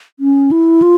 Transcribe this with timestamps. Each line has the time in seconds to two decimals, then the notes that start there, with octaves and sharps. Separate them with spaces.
0.20 C#4
0.51 E4
0.82 F4